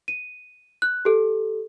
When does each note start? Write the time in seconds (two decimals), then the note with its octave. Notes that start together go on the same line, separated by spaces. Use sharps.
0.08 D#7
0.82 F#6
1.05 G4 A4